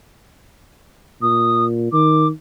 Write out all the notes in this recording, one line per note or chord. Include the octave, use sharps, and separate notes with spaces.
A#2 D#6
D#3 D6